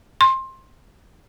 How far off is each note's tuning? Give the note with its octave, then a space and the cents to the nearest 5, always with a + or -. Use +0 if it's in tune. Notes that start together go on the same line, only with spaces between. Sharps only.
C6 +20